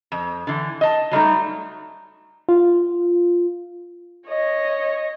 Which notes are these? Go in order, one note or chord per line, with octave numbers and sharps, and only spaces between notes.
F2
D3 E3
D#5 A5
F#3 G3 A3 D#4
F4
C#5 D#5